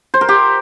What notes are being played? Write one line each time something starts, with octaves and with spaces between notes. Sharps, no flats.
C5
A#4
G4